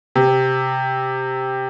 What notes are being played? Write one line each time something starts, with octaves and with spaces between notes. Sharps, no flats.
C3